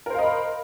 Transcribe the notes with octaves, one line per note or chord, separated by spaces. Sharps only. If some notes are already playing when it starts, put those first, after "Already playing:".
A#4 C5 D#5 F5 B5